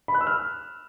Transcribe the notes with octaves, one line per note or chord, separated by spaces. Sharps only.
B5
F#6
E6
F6